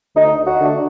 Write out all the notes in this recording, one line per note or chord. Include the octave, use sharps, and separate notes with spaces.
D2 D#4
F#4
D3 A3 D4